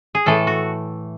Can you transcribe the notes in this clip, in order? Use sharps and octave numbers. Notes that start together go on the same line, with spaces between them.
G#4
A2 E3 A3 A4
F#4